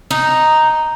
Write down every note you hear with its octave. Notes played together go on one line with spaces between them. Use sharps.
D#4